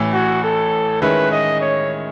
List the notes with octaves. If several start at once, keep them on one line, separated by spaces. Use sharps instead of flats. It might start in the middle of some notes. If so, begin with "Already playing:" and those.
Already playing: A1 A2 E3
F#4
A4
D#3 G#3 C#4 E4 B4
D#5
C#5